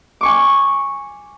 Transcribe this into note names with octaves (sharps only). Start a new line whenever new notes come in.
G#5 C#6 D6